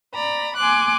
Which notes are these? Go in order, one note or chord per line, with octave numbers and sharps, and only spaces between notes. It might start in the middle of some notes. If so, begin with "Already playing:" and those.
D5 A#5 B5
G#5 C6 D6 F#6